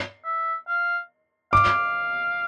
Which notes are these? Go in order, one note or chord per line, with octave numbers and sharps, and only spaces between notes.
E5
F5
F5 D6